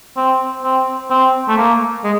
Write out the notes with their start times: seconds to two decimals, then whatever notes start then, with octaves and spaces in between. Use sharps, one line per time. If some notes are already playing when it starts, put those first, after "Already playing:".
0.17 C4
0.63 C4
1.10 C4
1.49 A3
1.57 A#3
2.04 G#3